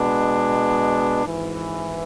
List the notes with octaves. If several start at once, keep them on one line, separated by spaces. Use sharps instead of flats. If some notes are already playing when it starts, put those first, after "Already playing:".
Already playing: B2 G#3 B3 D4
G#1 G#2 E3